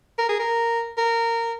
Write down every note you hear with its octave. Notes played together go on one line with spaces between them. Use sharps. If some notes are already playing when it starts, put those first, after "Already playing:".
A#4
G#4
A#4
A#4